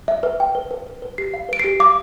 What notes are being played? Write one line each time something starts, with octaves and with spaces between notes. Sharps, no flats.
E5
B4
G5
B4
B4
B4
B4
G4 C7
F5
B4 D7
G4 C7
F5 D6